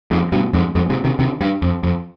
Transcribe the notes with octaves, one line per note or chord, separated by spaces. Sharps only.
F2 G#2
G2 B2
F2 G#2
F2 G#2
G#2 C3
C3 D#3
C3 D#3
G2
F2
F2